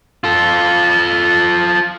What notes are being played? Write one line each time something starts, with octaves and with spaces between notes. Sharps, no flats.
F4 A4